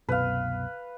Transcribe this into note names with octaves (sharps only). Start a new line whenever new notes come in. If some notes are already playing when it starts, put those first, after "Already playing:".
C2 F#2 B2 B4 F5